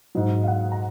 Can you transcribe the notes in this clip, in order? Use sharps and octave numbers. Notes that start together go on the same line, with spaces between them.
G#2 F#3 D#5
F5
F#5
A#5